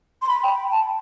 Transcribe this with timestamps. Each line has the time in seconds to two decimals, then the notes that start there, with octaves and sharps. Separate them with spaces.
0.22 C6
0.28 B5
0.43 G5
0.72 A5